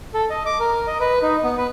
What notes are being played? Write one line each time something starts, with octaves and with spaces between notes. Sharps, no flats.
A4
D#5
D6
A#4
D#5
B4
D#4
B3
B4